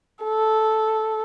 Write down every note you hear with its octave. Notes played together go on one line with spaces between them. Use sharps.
A4